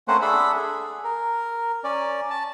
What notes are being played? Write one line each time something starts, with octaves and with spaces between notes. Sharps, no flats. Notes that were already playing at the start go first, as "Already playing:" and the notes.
A3 A#3 C4 C#4 C5 F#5
D4 G#4 A4 E5 F#5 B5
G#4
A#4
C#4 D5
A5